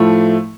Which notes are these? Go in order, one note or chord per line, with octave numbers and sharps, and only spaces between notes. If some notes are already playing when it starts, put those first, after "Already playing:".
Already playing: A2 F3 A3